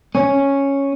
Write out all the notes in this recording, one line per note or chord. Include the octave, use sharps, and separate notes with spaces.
C#4